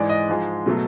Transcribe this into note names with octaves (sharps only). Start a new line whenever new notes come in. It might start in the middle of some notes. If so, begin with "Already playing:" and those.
Already playing: G#2 E3 G#3 D5
D#5
G#2 F3 G#3
B2 F#3 A3